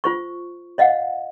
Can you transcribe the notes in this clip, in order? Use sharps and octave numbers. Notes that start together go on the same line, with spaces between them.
F4 C5 C#6
C#5 D#5 F5 F#5